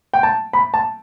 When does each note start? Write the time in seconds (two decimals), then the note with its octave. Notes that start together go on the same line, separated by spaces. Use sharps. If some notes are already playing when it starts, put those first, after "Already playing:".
0.13 G5
0.23 A5
0.53 B5
0.74 A5